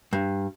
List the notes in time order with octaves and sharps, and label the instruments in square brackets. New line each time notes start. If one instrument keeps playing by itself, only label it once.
[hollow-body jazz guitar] G2